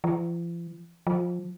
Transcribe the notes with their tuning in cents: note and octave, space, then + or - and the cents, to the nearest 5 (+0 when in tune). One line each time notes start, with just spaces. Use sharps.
F3 -45
F3 +20